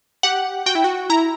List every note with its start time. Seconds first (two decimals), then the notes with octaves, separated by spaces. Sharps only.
0.23 G4 F#5
0.66 F#4 G5
0.75 E4
0.84 F#4
1.10 E4 A#5